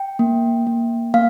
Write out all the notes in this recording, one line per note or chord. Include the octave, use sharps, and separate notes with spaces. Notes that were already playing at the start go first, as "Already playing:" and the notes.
Already playing: G5
A#3
A#3
A#3 F5